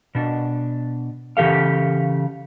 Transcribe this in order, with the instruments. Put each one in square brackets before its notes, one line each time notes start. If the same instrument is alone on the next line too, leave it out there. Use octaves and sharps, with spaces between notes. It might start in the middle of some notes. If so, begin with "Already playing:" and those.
[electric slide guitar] B2 D4
C#3 E3 G4 A4 F5